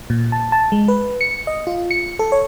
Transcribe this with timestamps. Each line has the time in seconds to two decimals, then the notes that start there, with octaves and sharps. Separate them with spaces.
0.10 A#2
0.32 A5
0.52 A5
0.72 G#3
0.88 B4
1.21 C#7
1.47 D#5
1.67 F4
1.91 C#7
2.19 A4
2.32 C#5